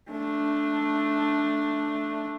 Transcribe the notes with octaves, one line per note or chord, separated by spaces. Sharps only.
A3 D4